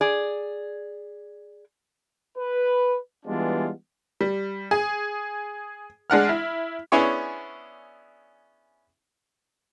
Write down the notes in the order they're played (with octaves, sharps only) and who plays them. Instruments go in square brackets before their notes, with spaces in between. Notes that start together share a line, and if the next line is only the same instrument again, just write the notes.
[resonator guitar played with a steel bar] G#4 D5
[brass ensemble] B4
E3 G3 G#3 B3 D4 F4
[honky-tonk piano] G3
G#4
G#3 D4 F#5 F6
E4
[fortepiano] B3 C#4 D4 E4 G#4 C#5